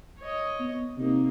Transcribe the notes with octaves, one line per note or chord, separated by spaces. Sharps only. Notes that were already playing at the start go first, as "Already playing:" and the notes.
C#5 D#5
B3
C3 A#3 D#4